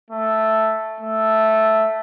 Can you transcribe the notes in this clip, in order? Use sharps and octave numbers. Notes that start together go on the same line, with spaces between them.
A3
A3